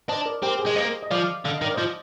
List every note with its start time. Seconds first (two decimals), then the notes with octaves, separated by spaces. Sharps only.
0.08 D4 C5 D#5
0.26 A#4 D5
0.42 C4 G4 A#4
0.59 G#4 C5
0.66 G#3
0.76 A#3 C5 D#5
1.03 D#5
1.11 F3 D5 F5
1.45 D3 F5
1.54 D#5
1.61 D#3
1.64 D5
1.74 F3 C5 D#5